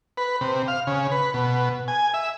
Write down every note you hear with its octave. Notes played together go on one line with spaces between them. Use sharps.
B4
C3
F5
C#3
B4
B2
G#5
E5